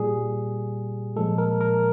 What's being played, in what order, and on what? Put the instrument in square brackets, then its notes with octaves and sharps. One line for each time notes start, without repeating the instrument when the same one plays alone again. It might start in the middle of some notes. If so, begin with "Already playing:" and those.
Already playing: [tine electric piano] A#2 G3 G#4
A#2 F3 G#3 A4
A#4
A#4